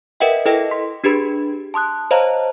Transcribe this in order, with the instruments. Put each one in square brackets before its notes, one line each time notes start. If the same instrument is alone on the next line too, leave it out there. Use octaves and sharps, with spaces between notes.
[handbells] A#4 B4 D#5 E5 F#5 G5
E4 A4 B4 D#5 G5
C6 B6
D4 G4 G#4 B4 B5
A5 C6 D#6 F#6
C5 C#5 D#5 F5 A5 A#5